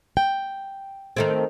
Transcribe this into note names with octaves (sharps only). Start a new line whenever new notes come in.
G5
D#3 A3 C4